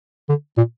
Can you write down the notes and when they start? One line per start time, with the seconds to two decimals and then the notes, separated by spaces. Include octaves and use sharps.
0.29 D3
0.58 A#2